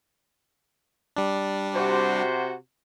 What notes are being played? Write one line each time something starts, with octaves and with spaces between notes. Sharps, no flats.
G3 D4
C3 F#4 C5